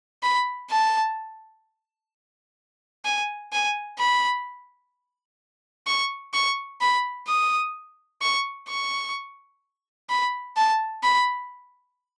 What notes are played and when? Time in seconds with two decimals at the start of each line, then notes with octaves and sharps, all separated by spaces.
0.23 B5
0.70 A5
3.05 G#5
3.52 G#5
3.99 B5
5.87 C#6
6.34 C#6
6.81 B5
7.27 D#6
8.22 C#6
8.69 C#6
10.09 B5
10.56 A5
11.03 B5